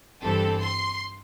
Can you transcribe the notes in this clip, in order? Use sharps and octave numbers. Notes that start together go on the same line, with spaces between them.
G1 G2 E3 C4 A4
C6